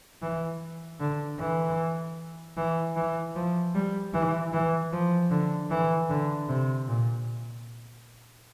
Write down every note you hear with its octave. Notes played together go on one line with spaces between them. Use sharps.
E3
D3
E3
E3
E3
F3
G3
E3
E3
F3
D3
E3
D3
C3
A#2